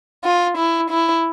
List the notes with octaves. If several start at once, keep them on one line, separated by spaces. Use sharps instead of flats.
F4
E4
E4